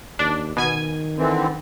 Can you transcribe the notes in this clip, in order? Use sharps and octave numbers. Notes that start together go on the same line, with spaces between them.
D#2 D4
B2 D#3 G#5 G#6
D3 E3 C4